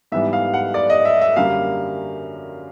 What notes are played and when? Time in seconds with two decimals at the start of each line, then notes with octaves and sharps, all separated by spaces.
0.12 G#2 E3 G3 B3 E5
0.33 F5
0.54 F#5
0.74 D5
0.90 D#5
1.05 E5
1.21 E5
1.36 F#2 D3 G3 A#3 F5